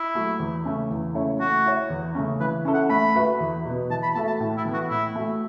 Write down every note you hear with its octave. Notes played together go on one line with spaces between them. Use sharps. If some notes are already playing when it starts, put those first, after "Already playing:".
Already playing: E4
F#3 A3 F#4
E2
C#3 A3 C#4
E2
C#3 A3 E4 C#5
A3 F#4
E4 C#5
E2
C#3 A3 C#4
E3 B4
C#4 E4 A4
F#5
A3 B5
F#4 B4 E5
E2
B2 B3
E3 A5
B5
A3 F#4 A4 E5 A5
A5
A2
E4
E3 B3
F#4
A2 E4
A3 F#4